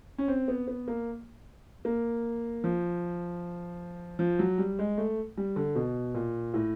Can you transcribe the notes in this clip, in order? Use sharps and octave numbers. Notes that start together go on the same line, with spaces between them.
C#4
C4
B3
B3
A#3
A#3
F3
F3
F#3
G3
G#3
A3
G3
D3
B2
A#2
A2